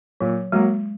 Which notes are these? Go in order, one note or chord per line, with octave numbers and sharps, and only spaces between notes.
A#2 F#3
F#3 G#3 A#3